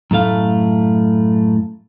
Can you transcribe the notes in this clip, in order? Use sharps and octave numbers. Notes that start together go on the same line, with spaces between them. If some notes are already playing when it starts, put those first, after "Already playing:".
F#2 A2 A3 F5